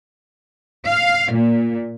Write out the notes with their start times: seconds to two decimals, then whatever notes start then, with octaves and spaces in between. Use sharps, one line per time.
0.87 F5
1.31 A#2